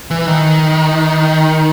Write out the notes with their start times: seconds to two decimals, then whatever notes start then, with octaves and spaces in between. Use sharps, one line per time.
0.11 E3
0.28 D#3